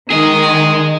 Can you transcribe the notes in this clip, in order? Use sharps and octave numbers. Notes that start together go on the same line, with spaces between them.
D#3 G#4 D#5